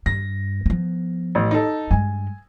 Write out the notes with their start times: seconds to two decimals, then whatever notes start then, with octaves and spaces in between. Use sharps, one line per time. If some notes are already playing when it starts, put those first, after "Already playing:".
0.06 G2 A#6
0.66 F3 B3
1.35 A1
1.51 D#4 A4
1.91 G2 G#3 G#5